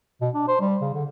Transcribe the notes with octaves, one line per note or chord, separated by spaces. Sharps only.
B2
D4
C5
G3
C#3
D3